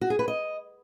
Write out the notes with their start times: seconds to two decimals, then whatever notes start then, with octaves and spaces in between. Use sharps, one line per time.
0.01 F#4
0.10 G#4
0.19 B4
0.28 D#5